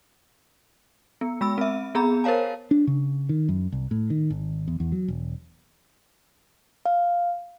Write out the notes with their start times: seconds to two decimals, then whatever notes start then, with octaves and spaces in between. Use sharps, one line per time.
1.21 B3
1.41 G#3 B5 E6
1.58 C4 E5
1.95 B3 G#4 A#5 B5
2.24 A#4 C5 C#5 F5 A5
2.71 D4
2.87 C#3
3.29 D#3
3.49 F#2
3.72 C2
3.91 A2
4.10 D#3
4.30 G#1
4.68 E2
4.80 E2
4.92 F#3
5.08 E1
6.86 F5